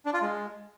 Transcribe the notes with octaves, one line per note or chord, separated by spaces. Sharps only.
D4
F4
G#3